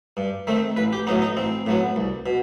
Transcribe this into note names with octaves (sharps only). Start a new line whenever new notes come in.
G2
D#3 A3 C4
A1 B4
G4
A2 F#3 B3 D#4
D#4
A1 C4
A2 F#3 B3
C2
B2